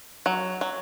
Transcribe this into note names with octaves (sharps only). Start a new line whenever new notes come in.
F#3
F#3